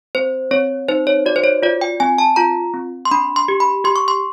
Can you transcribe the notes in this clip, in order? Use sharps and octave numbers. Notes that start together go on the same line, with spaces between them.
C4 C5
C4 C#5
D#4 C5
C#5
F#4 D5
C5
C#5
F4 D5
G5
C4 G#5
A5
F4 A#5
C4
C6
D4 B5
C6
G4
B5
G4 C6
C#6
C6